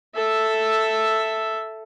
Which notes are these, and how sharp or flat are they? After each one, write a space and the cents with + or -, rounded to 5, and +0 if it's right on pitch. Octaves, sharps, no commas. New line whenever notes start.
A4 +0 E5 +0